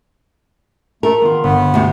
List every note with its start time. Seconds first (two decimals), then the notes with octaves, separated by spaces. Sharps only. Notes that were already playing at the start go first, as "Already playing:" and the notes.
1.03 A3 A#4
1.21 D#3 B3 F4
1.44 G1 B3
1.74 D2 C3